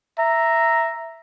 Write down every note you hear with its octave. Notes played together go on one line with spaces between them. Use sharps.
E5 A#5